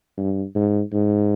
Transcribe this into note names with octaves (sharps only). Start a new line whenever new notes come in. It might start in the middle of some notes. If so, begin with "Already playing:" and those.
G2
G#2
G#2